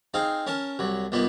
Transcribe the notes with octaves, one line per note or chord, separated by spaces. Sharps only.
C4 D#4 G#4 F5
C#4 A#4 A5
C2 F#3
C2 A#2 B3 D#4